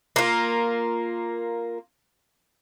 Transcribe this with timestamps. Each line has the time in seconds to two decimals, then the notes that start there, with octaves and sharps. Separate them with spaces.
0.16 A#3 F4